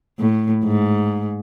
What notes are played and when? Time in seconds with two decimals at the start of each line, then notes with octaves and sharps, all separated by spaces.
0.19 A2
0.64 G#2